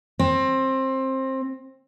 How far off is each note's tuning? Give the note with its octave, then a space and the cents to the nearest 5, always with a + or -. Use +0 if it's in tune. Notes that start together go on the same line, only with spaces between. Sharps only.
C4 +20